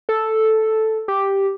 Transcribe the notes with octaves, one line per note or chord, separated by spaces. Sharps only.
A4
G4